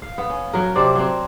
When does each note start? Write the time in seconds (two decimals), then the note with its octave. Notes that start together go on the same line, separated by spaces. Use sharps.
0.02 F5
0.18 B3
0.30 C#4
0.54 F#3 A#4
0.75 C3 C4 D4 D5
0.95 F#3 C4